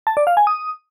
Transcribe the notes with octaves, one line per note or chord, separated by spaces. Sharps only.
A5
D5
F5
G#5
D#6